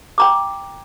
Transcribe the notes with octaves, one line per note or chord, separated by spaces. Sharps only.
G5 A#5 D6